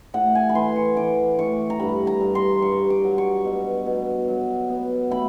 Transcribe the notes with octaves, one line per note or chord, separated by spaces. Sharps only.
A2 F#5
G#5
B5
E3 C6
C#6
E3 D6
A2 C#6
A#5
G2 B5
A#5
G2
C6
G2 C#6
D6
F#3
C#6
B2
B2
F#3
B3
A3 B5